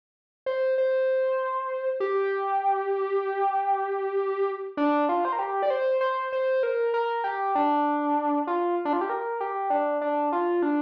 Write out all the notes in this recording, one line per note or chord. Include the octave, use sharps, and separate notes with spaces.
C5
C5
G4
D4
F4
C5
A#4
G4
D5
C5
C5
C5
A#4
A#4
G4
D4
F4
D4
F4
G4
A#4
G4
D4
D4
F4
D4